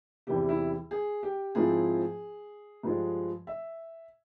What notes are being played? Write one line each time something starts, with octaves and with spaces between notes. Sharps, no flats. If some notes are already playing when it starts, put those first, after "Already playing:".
E2 C3 E3 G3 G4
E4
G#4
G4
G#2 F3 C4 E4 G#4
G2 F3 G#3
E5